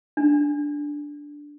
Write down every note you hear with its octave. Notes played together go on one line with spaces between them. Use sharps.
D4